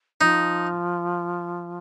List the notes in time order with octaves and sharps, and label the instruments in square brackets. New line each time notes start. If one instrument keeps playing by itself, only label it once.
[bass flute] F3 [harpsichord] D#4